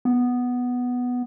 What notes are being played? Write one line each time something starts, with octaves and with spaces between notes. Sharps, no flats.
B3